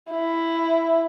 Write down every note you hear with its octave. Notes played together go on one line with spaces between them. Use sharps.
E4